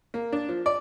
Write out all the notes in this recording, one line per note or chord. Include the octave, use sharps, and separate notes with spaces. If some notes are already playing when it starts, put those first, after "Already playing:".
A#3
D4
F3
D5